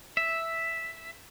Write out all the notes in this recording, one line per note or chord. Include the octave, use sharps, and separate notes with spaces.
E5